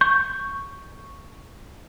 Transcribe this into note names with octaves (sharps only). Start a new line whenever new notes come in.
C#6 G6